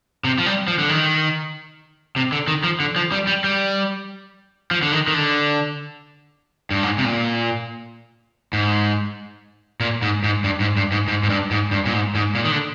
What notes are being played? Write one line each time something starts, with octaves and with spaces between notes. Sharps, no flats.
C3
F3
G3
F3
D3
D#3
C3
D3
D#3
F3
D3
F3
G3
G3
G3
F3
D3
D#3
D#3
D3
G2
G#2
C3
A#2
G#2
A#2
G#2
G#2
G2
G#2
G2
G#2
G#2
G#2
G2
G#2
G2
A#2
G#2
G#2
A#2
D#3
D3